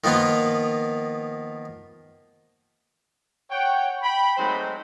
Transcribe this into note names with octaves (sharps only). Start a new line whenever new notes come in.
D#3 F3 A#3 B3 F4
C#5 F#5 G5
G5 B5
F#3 G#3 A3 C4 D#4 C5